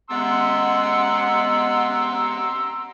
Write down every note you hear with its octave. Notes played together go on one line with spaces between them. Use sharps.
G#3 B3 F#5 A#5 C6 E6